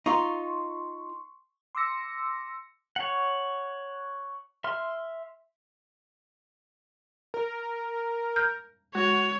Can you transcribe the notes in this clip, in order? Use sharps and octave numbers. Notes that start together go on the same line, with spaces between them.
D#4 F4 C6 C#6
C6 D6 E6 A#6 C#7
C#5 F#5
E5 C6 F6
A#4
F6 G6
G#3 F#4 C#5